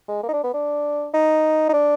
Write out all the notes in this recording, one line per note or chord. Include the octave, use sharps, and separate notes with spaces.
G#3
A#3
D#4
D4
B3
D4
D#4
D#4
D4